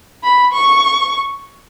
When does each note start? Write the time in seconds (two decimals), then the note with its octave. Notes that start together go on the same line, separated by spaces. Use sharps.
0.23 B5
0.53 C#6